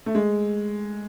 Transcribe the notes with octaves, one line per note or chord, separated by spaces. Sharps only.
A3
G#3